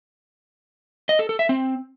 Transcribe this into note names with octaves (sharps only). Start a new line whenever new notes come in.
D#5
A4
A4
E5
C4